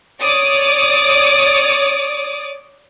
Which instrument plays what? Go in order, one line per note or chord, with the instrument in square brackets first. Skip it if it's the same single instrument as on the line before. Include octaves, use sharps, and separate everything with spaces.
[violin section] C#5 D5 D6 D#6